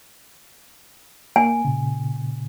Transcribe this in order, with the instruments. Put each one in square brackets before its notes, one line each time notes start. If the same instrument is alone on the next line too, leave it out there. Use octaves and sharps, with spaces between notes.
[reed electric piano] A#3 [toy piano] G#5
[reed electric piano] A#2 C#3